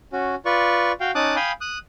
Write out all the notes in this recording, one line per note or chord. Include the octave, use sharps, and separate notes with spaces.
C#4 F#4
F4 B4 D5 C#6
F#4 F5 G5
C#4 D#4 A5 D6 D#6 F#6
F5 G5 G#5 B5 D#6
D#6 F#6